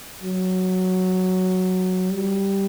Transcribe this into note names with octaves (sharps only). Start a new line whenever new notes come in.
F#3
G3